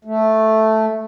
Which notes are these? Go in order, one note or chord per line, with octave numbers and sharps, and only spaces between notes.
A3